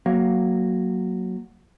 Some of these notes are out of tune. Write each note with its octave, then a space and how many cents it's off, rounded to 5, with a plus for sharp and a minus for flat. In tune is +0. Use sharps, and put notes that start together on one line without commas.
F#3 +0 A#3 +0